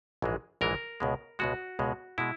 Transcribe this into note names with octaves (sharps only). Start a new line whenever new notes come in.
A#1 G#2 E3 G#3
A#1 G#2 E3 G#3 A#4
C#2 B2 G#3
C#2 B2 G#3 F#4
C#2 B2 G#3
B2 G#3 E4